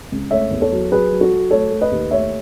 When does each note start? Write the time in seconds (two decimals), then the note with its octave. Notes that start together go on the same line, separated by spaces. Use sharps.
0.12 C#2
0.31 A3 C#5 E5
0.51 E2
0.61 A4 C#5
0.72 F#3
0.92 F#3 G#4 B4
1.12 F#3
1.21 F#4 A4
1.31 F#3
1.51 A3 A4 C#5
1.71 A3
1.81 B4 D#5
1.91 D#2
2.11 A3 C#5 E5